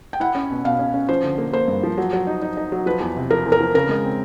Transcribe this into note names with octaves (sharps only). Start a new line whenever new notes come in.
G5
E4 F#5
C#4
B2
B2 F5
C#4
C#4
F3 C5
D3
A#3
A#3 C5
G2
F3
F#3
F#3
D#4
D#4
D#4
F#3
F3 B4
E2
C3
F3 A#4
E2
A#4
F3
C#3 A#4
G#3
C4